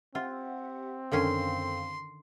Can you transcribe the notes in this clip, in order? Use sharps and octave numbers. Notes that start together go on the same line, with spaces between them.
C4 F4 G4 E5 F#5
F#2 D3 D#3 C#4 A4 F5 C6